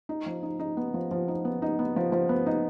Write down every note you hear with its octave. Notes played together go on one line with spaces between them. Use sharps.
D#4
F3
D#4
D#4
B3
F3
F3
D#4
B3
D#4
B3
F3
F3
B3
D#4